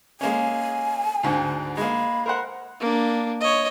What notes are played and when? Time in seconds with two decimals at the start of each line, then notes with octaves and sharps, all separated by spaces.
0.21 G#3 A#3 C#4 G#5
1.23 D2 G#2 D3
1.77 G#3 A#3 B5
2.26 A#4 C5 F#5
2.80 A#3 D4
3.41 C#5 D#5